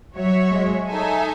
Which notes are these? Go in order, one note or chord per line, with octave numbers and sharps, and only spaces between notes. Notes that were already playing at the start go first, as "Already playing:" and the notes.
F#3 F#4 C#5 E5
G#3
D#4 A4 E5 G#5